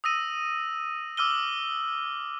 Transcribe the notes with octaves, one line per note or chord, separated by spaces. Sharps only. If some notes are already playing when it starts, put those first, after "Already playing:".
D#6 E6 A#6 D#7
D6 E6 F6 D#7 G7